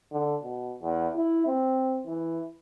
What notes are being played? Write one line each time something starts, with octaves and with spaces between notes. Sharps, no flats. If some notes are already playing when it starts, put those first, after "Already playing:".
D3
B2
E2
E4
C4
E3